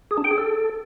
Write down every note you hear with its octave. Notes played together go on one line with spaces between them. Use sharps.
G#4
D4
G5
G#4
A4